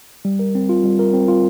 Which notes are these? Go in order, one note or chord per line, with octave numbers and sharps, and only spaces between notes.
G3
A#4
C4
F4
G3
A#4
C4
F4